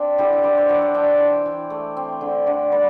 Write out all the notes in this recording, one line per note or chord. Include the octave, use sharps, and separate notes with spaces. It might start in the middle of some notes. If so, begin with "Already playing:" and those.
Already playing: C4 D4
D3 E4 G4
E5
D3 B4 D5
C5 E5
F#3 D5 F#5
D5 F#5
D4 E5 G5
E3
E3
A3
C4
D3
D3 D5 F#5
G3 B4 D5